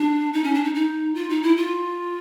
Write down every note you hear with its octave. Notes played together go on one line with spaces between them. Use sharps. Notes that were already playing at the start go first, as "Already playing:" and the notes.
Already playing: D4
D#4
C#4
D4
D#4
D#4
F4
D#4
E4
F4